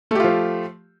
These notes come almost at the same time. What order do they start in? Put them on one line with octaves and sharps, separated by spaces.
A3 G4 F4 F3